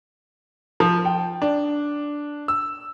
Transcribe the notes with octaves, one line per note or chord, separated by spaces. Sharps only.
F3
G5
D4
E6